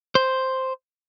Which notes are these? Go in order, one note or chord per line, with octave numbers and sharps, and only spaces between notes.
C5